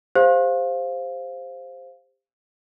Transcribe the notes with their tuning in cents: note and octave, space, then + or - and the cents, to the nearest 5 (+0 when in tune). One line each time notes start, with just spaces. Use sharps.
G4 +30 C5 +0 F5 +0